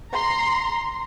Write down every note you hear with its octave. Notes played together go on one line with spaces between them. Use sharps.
A#5 C6